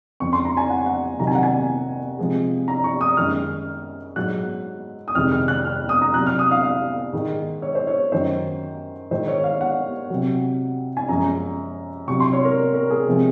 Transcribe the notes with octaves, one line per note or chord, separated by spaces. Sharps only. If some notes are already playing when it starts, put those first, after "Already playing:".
F2 C#3 F3 C#6
C6
A#5
G#5
F#5
F#5
C3 D#3 F#3 A#5
G#5
F#5
G#5
C3 F3 G#3
A#5
C#6
D#6
F#2 D#3 G#3 F6
G#2 F#3 F#6
D#6
F2 C3 D#3 G#3 F6
F6
F#6
F6
D#6
A#5
C3 F#3 F#6
F6
D#6
F5
F5
G#2 D#3 G#3
C#5
C5
C#5
F#2 D#3 F#3 C5
G#2 D#3 G#3 C5
C#5
F5
F#5
C3 F#3
G#5
F#2 F3 G#3 A#5
C3 F#3 C#6
C6
C#5
A#4
A#4
G#4
C3 F3 G#3